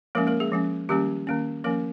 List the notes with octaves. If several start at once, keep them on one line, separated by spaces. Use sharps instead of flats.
F3 G#3 A#3 C#4 A#4
A#3 A#4
G#3 G#4
F3 G#3 C#4
D#3 G3 A#3 C#4 G4
D#3 A#3 C#4
F3 A#3 C#4 A#4